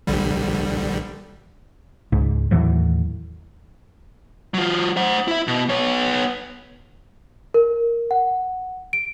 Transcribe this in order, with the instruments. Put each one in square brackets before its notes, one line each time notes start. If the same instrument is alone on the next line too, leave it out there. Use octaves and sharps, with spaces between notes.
[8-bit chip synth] A#1 D3 G3
[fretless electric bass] C#2 G#2
D#2 A2 E3 F#3
[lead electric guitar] F#3 F4
C5 F#5
E4 E5
B2
B3 C#5
[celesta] A#4
F#5
D7